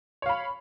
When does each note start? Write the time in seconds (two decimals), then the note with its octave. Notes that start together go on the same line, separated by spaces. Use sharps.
0.22 C#5
0.26 F5
0.29 B5